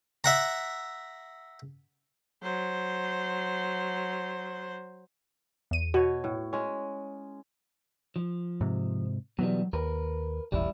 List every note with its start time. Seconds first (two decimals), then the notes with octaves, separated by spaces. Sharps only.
0.24 E5 F#5 A#5
2.43 F#3 C5
5.71 E2 D#7
5.94 B2 F#4 C#5
6.24 A2
6.53 G#3 C#4
8.16 F3
8.61 G#2 C3
9.39 B2 E3 F#3 G3
9.73 D#2 A#4 B4
10.52 E1 A1 E2 G3 E4